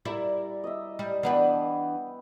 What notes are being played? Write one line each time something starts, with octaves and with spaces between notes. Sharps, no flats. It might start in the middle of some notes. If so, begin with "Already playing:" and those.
G3 E4 A#4 D5
D#5 E5
G3
E3 B3 D4 B4 G5